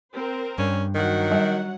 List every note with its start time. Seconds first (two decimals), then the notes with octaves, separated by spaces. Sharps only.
0.14 C4 A#4 C5
0.58 G2 C#4
0.94 D#3 F#3 F#5
1.32 G3